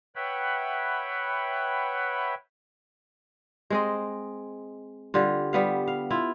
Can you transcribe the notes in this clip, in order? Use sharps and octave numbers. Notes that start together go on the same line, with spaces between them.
B4 C#5 E5 F#5 G5 B5
G#3 C4 D#5
D3 G3 F4
G3 B3 F5
F5
E4 F4